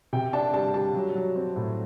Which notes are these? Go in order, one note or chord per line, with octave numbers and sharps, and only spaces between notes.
C3 G5
D4 A5
G3 A5
G3 A5
F#3
F#3
C4
A2